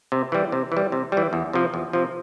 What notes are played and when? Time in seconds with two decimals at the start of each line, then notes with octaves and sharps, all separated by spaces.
0.12 C3
0.32 E3 G3
0.52 C3
0.72 E3 G3
0.92 C3
1.12 E3 G3
1.33 E2
1.53 C3 F3
1.74 E2
1.93 C3 F3